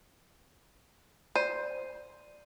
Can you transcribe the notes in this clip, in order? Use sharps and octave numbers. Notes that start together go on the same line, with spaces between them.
C5 D5 D#7